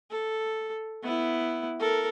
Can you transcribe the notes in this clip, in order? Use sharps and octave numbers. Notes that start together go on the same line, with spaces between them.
A4
B3 E4
A4 A#4